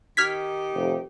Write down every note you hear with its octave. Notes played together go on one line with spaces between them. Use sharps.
D#3 D#4 G4 F6 G#6 B6
F1